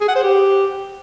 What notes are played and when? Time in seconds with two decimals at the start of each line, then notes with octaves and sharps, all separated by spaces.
0.01 G#4
0.08 F#5
0.16 C5
0.23 G4